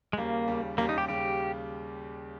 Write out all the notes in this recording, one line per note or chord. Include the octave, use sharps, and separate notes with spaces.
G#3
D#2 C#3 G3 A#3
D#2 C#3 G3
D#2 C#3 G3 A#3
D#4
G4
C#3 G3 G4